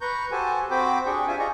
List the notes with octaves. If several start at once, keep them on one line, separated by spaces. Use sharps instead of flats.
B4 A#5 C#6 G6
F#4 G4 A4 C5 G#5 A5
C4 F#4 C5 G5 B5 D6
D4 G4 G#4 G5 C#6
D4 F4 C5 E5 G#5
F4 G#4 D5 D#5 A#5 C#6